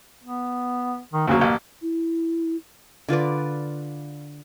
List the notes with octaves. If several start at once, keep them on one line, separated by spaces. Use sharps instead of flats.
B3
D#3
D2 C#3 F#3 A#3
A1
E4
D3 F4 B4 D5